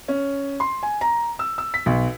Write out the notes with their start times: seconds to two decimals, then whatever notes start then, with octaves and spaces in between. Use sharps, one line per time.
0.08 C#4
0.60 C6
0.83 G#5
1.01 A#5
1.39 E6
1.58 E6
1.74 B6
1.86 B1